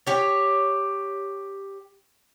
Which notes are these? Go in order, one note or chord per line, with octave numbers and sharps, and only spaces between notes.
G4 C#5